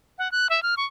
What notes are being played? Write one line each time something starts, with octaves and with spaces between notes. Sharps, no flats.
F#5
F#6
E5
F6
C#6